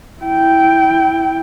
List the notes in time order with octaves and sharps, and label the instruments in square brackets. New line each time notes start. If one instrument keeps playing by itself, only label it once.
[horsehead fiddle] E4 G5